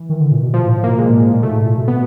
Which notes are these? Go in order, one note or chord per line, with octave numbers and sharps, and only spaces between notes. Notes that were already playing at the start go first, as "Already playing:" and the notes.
Already playing: E3
D#3
D3
A#2
B2
A#2 F3
A2
A2
B2 A#3
B2 G#3
A2
A2
A#2
B2 A3
G#2
A2
A#2
B2
B2 B3